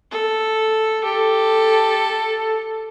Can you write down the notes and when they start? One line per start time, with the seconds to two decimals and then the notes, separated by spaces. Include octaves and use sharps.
0.11 A4
1.04 G4 A4